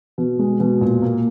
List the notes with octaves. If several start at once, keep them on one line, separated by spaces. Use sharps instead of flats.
B2
G#3
B2
A#2
A#3